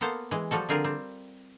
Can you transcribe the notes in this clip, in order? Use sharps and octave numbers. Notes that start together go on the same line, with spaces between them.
A#3 B3 A4 C5 F5
E3 G#3
F3 G3 F#4 A4
D3 C4 F4 G#4 A#4
G3 C4